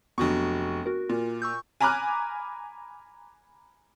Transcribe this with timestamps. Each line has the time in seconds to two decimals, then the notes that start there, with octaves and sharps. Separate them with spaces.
0.18 F1 F#3 B3 D4 C#6
0.86 F#4 A#4
1.09 A#2 F4
1.42 C#6 E6 G6
1.81 G#5 A#5 B5 D6 F6 F#6